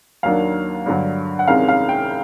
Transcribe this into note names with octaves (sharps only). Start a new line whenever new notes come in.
D#2 D#3 F#3 A#3 D4 F5
G2 D3 F#3
F#5
C2 C3 D#3 G#3 C#4 F5
F5
G5